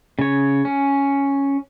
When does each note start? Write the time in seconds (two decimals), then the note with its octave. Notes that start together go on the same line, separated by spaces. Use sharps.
0.19 C#3 C#5
0.65 C#4